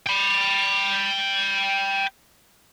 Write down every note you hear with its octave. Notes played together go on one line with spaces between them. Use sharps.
G5 B5